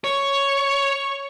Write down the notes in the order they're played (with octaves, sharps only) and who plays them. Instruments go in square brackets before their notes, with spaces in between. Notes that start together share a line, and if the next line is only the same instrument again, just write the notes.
[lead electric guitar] C#5 [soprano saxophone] C#6